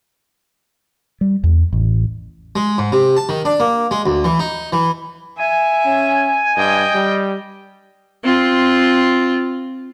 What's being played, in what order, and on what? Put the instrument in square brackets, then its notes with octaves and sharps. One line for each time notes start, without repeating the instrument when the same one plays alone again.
[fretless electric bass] G3
E2
A1
[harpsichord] G#3
G#2
C3
A5
D#3
D4
A#3
G#3
D2
E3
D#4
E3
[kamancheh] E5 [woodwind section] G#5
[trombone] C#4
[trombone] G2 [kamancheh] D#5 G5
[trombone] G3
[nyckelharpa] C4 F4